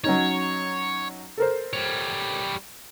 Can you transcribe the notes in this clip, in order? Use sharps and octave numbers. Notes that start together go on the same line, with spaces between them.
F#3 C#4 D#4 C#5
A4 A#4 C5
G3 C#5